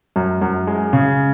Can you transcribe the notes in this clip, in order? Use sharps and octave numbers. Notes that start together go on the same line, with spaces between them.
F#2
F#2
G#3
C#3